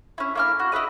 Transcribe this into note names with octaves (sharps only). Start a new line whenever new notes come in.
C#4 E4
A#3 E4 F6
F#4
E4 F#4 B4 D#5